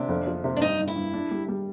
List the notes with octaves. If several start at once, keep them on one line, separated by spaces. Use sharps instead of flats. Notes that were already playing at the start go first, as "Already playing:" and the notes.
Already playing: C3 D4
F2
F3
C3
D4
G2 D#4
G2
E4
G2
D4
G3
G3